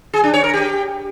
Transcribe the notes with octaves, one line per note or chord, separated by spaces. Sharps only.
G#4
D4
C#5
A#4
G4